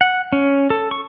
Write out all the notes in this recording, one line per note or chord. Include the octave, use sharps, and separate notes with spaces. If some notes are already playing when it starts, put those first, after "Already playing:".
F#5
C#4
A4
C#6